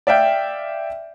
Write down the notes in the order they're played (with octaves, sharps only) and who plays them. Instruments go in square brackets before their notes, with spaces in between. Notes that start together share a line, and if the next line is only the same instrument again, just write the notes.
[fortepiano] D5 E5 F5 G5